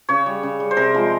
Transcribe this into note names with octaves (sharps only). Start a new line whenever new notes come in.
C#3 C#5
G3
C#3
G3
C5
C3 A#4
F3 G#3